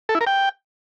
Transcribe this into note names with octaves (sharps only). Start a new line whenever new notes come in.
A4
E4
A#4
G5